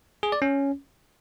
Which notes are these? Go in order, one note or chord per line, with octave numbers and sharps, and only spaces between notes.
G#4
D5
C#4